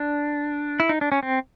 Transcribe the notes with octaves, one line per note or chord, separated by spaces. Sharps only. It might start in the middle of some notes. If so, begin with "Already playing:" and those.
Already playing: D4
E4
D#4
D4
C#4
C4